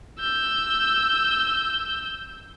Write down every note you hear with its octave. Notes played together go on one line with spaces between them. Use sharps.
E6 G6